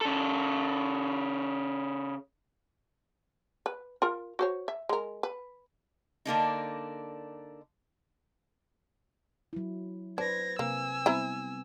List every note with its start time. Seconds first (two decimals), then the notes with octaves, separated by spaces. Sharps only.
0.01 C#3 A4
3.66 B4
4.02 F4 A#4
4.39 F#4 C5 C#5
4.68 E5
4.89 G#3 A#4
5.23 B4
6.25 D3 A#3 D4 D#4
9.53 F#3 E4
10.18 D4 B4 C5 G#6 A#6
10.59 C3 A#3 G#5 E6
11.06 G3 B3 C4 E4 C5 A#5